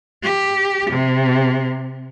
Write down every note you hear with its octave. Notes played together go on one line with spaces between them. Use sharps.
G4
C3